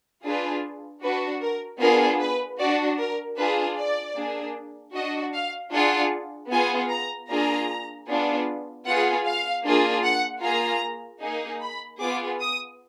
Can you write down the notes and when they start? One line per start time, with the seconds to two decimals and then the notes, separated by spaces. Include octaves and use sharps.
0.23 D4 F4 G#4 B4
1.02 D4 F#4 B4
1.41 A#4
1.80 B3 D4 F4 G#4 A#4
2.20 B4
2.59 F#4 D5
2.64 D4
2.99 A#4
3.37 D4 F4 G#4 B4
3.77 D5
4.16 A#3 D4 G#4
4.94 D4 F#4 D#5
5.34 F5
5.72 D4 F4 G#4 F#5
6.51 B3 F4 G#4 G#5
6.90 A#5
7.30 A#3 D4 F4 G#4 A#5
8.08 B3 D4 F4 G#4
8.86 B3 F4 G#4 F#5
9.26 F5
9.65 A#3 D4 F4 G#4
10.04 F#5
10.43 A#3 F4 G#4 A#5
11.22 A#3 D#4 G#4
11.61 B5
12.00 B3 F4 G#4 D6
12.40 D#6